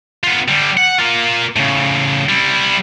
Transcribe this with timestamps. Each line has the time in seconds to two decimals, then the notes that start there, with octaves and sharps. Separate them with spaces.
0.24 B3 F4
0.48 D3 G3
0.77 F#5
0.98 A#3 F4
1.56 A2 C#3
2.29 G3 E4